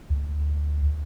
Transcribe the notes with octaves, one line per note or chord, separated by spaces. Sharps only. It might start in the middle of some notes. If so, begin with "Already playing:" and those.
D2